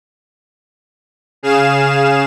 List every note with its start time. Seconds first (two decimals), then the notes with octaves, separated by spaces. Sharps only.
1.43 C#3 G#4 F5 E7